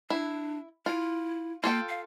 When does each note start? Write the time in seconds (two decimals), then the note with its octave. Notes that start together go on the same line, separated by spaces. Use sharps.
0.10 D4 E4
0.86 E4 F4
1.64 A#3 F4 A4 G5
1.89 F5